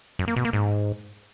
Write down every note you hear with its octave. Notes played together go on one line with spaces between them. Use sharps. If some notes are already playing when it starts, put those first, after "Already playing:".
F#2
A#3
B2
A#3
G#2